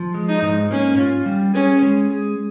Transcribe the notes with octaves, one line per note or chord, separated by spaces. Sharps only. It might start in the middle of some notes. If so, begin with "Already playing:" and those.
Already playing: F3
G#3
D#4
G#2
A#3 C#4
F4
G3
C#4 G#4
G#3
G#4